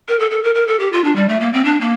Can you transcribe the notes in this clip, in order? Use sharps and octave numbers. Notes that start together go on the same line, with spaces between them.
A#4
A4
A4
A#4
A#4
A4
G4
F4
D4
G3
A3
A#3
C4
D4
A#3